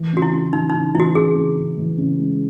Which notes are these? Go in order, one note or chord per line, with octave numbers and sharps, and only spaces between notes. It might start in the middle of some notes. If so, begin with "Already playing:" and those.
Already playing: E3
C#3 F#4
E4
C#3
E3 D#4
C#3 D#4
E3 E4 F#4
C#3 G#4
C#3
C#3
E3
C#3
G#3